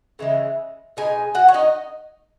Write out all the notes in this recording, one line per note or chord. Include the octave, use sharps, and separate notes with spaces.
C#3 E3 G#3
B2 G#3 D#4 G#5
F#4 F#5
C#5
D#4 D#5